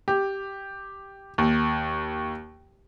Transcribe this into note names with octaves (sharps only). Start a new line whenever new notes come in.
G4
D#2